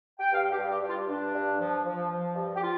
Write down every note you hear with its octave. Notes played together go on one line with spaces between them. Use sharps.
G5
G2 F5
G4
G2
G4
G2
F4
G2 D4
G2
F3
F3
F3
G2
G4
F4